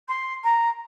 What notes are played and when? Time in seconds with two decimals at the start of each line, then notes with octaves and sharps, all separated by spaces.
0.08 C6
0.43 A#5